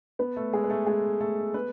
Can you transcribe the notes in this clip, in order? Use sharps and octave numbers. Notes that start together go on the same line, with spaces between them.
B3 B4
A3 A4
G#3 G#4
B4
A3 A4
G#3 G#4
A3 A4
B3 B4